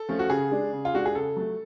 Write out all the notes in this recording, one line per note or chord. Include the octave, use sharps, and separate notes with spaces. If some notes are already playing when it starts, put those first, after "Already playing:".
Already playing: A4
F3 A3 C#4
F#4
C#3 G#4
G#3 D4
C#3
F4
G#3 D4 F#4
G#4
C#3 A4
F#3 A3